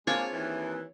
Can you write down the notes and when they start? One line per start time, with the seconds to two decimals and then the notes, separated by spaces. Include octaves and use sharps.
0.07 G#3 A#3 C4 D4 F4 G#4 C#5
0.32 D#2 E3